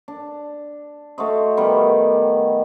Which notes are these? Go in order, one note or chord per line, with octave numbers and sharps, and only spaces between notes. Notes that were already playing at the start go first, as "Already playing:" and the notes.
D4
A3 F#4 C5 D#5
D#3 G3 B3